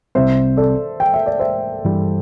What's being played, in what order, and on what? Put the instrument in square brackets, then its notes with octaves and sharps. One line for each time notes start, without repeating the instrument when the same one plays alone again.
[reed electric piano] C2 C3 G3 C4 [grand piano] C5 E5
[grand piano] A4 D5
G5
E5
D5
C5 E5
[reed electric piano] G2 E3 G3